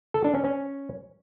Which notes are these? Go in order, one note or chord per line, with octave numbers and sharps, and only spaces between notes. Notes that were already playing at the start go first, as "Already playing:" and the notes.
A4
D4
C#4
C#4